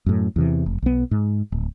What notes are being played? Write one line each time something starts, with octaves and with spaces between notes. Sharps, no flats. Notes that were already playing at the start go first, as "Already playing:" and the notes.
F#2 A2
E2 C3 E3
F1
B1 B3
G#2
D1